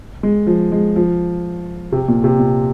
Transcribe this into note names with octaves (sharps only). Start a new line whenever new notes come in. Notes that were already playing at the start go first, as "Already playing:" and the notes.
G#3
F3
G#3
F3
C3
A#2
C3
A#2